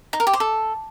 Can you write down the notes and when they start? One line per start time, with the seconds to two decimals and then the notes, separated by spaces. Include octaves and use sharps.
0.13 D#4
0.20 A#4
0.27 G4
0.33 C5
0.40 A4